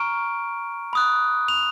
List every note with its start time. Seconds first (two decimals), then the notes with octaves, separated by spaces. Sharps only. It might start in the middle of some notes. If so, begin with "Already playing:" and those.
Already playing: A#5 C#6 F6 D7
0.93 B5 D#6 F#6
1.48 F7